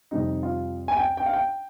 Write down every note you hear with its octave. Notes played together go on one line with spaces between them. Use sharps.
F2 C3 G3 C4 D#4
F4
G#5
G5
G5
F5
G5